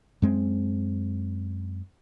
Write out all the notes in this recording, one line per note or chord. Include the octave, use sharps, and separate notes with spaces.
F#2 G#3 C4